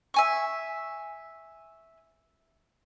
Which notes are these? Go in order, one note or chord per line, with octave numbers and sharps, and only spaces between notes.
E5 G#5 C#6